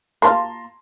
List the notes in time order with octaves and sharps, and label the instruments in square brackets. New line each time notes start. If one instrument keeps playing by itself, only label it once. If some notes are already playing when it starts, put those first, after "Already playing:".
[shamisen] A#3 F4 [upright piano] A5 A#5 C6